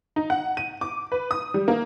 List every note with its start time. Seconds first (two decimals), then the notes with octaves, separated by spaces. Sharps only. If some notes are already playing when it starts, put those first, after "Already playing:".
0.16 D#4
0.30 F#5
0.57 D#7
0.81 D6
1.12 B4
1.31 D#6
1.54 G3
1.68 A#3